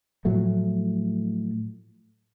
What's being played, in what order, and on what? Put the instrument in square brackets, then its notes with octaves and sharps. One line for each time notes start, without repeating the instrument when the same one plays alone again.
[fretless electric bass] A2 F3 F#3 A3